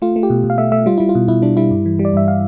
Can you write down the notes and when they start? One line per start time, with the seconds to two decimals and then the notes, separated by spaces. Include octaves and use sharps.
0.02 A3 F4
0.16 A3
0.23 G4
0.30 B2
0.44 B2
0.50 F5
0.58 A3 E5
0.72 A3 E5
0.86 G3 F4
0.98 G3 E4
1.09 F4
1.15 B2
1.28 B2 E4
1.42 G3 D4
1.57 G3 E4
1.71 G2
1.86 E3
1.99 G3
2.05 D5
2.14 G2 E5
2.28 F5